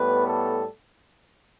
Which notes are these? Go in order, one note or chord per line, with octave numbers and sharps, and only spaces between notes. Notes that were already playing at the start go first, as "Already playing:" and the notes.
Already playing: A2 G3 B3 B4
A4